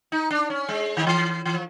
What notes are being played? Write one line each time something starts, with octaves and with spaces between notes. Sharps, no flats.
D#4
D4
C#4
G#3
D#3
E3
E3
F3